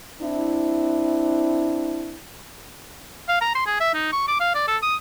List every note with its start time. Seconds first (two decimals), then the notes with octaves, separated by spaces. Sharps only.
0.21 C4 D4 E4
3.28 F5
3.41 A#5
3.55 C6
3.66 G#4
3.80 E5
3.94 D#4
4.12 C#6
4.27 D6
4.40 F5
4.54 D5
4.68 A4
4.82 D#6